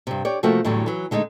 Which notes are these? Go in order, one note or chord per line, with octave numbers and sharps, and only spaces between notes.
G2 C3
G4 C#5 D5
C3 F3 A3 A#3 C4 F#4
E2 A2 D3 F#3 G3
E3 F#3
D3 G#3 A3 D4 D#4